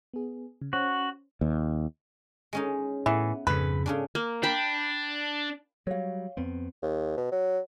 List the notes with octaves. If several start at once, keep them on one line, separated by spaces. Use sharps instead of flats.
B3 G#4
C#3
C#4 F#4 C5
D#2
G#3 C#4 D#4
A2 E3 B3
F2 G#2 C#3 B4
C#3 C#4 D4
A#3
D4 G5 B5
F#3 G3 C#5 F5
F2 B3 C4
D#2
B2
F#3